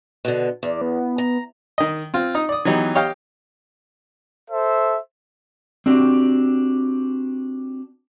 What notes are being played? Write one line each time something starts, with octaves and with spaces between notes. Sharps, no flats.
B2 D3
E2 D5
B3
A#5
D#3 D#5
C4 F4
D#4 D#6
D5 D#6
E3 F#3 B3 D#4 G4
G4 C#5 D#5 F5 G5
A4 C5 E5
C4 D4 F#4 G4